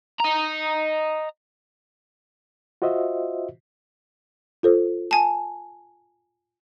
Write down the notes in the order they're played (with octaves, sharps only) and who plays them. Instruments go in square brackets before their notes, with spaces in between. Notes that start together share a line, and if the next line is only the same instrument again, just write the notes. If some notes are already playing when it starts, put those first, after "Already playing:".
[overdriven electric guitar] D#5 A#5
[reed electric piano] F4 F#4 C5 D#5 E5
[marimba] F4 A4 C5
[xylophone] G#5 A5